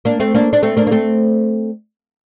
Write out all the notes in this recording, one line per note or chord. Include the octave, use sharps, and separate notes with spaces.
A#3 D4
A3 C4
A#3 D4
D4
A3 C4
A#3 D4
A#3
A3 C4